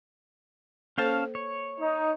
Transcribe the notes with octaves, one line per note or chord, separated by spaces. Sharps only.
A#3 C#4 A4 C5 F5 A5
C#5
D#4